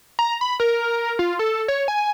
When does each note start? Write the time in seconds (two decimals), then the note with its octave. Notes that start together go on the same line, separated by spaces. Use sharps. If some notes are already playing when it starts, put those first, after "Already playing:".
0.19 A#5
0.41 B5
0.60 A#4
1.19 F4
1.39 A4
1.68 C#5
1.88 G#5